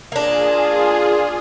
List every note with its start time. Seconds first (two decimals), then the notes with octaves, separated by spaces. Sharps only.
0.12 A#3 D4 F4 G#4